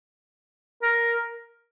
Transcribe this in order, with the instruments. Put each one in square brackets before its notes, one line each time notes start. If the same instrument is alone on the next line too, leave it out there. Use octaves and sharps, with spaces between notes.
[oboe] A#4